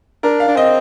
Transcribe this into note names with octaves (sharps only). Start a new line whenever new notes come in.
D4 A#4
F5
D4
C4 D#5